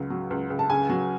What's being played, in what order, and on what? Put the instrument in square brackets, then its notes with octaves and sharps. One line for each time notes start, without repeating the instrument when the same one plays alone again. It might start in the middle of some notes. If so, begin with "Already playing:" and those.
Already playing: [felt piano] C#2 C#3 F#3
F#3
C#2
C#2
[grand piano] A5
[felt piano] C#3 [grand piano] G#5
[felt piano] F#3